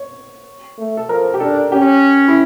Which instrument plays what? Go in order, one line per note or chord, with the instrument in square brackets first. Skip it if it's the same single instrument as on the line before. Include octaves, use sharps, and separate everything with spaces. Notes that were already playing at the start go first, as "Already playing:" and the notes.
Already playing: [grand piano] C#5
[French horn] A3
[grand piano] A4
[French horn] F3 [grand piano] A#4
[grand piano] G4
[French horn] D4 [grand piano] A4
[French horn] C#4 [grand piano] G4
[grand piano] E4